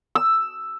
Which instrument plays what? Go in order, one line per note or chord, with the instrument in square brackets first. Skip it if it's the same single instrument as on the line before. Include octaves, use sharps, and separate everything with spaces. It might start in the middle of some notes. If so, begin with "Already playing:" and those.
[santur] E6